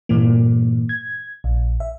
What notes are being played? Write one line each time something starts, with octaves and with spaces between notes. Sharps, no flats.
G2 A#2 E3 A#3
G#6
A#1
E5